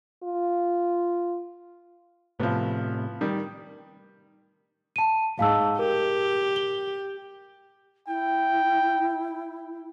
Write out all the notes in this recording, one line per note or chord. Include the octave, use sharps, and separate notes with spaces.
F4
A2 C3 F3 B3
D#3 G3
A5 D#7
G#2 F5 A5 E6
G4 A#4
G7
E4 G5